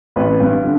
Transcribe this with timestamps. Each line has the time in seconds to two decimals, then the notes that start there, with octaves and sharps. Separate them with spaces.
0.16 A1 B4
0.40 G2
0.64 D3